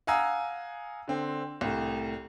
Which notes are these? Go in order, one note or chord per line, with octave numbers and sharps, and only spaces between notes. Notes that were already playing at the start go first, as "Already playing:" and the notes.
F5 F#5 G#5 A#5 D#6 E6
D3 C4
C2 A2